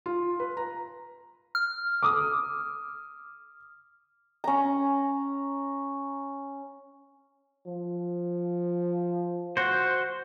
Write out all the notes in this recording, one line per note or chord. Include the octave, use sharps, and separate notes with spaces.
F4
B4
A#5
F6
D6 D#6
C#4 A#5
F3
F#4 C5